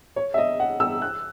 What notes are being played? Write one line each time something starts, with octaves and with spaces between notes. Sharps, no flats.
C#5
E5
D#5
F#5
E6
F#6